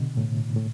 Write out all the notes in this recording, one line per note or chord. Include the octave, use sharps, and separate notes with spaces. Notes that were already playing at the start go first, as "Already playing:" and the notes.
Already playing: B2 D3
A2
A2